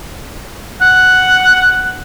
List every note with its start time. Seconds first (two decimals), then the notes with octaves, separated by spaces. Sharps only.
0.82 F#5